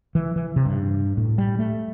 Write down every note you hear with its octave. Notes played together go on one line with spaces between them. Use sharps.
E3
E3
C3
G2
A2
G3
A3